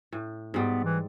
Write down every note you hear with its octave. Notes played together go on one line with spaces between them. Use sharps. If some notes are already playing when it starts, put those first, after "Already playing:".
A2
G#2 G3 B3
E3